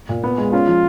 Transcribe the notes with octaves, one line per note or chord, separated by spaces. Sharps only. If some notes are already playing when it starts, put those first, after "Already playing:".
A#2
B3
G#3
C#4 F4
F3